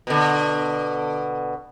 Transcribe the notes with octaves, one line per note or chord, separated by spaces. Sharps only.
B2 D3